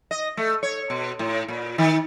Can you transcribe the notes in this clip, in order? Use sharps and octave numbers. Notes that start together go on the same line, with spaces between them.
D#5
A3
C#5
B2
A2
A#2
D#3